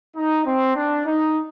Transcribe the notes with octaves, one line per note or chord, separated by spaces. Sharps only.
D#4
C4
D4
D#4